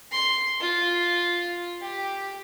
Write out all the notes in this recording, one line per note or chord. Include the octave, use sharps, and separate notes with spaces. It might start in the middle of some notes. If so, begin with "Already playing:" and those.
C6
F4
G4